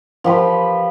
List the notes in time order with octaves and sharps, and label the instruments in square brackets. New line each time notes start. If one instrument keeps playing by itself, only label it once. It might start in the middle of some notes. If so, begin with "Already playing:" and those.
[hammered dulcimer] F3 G4 B4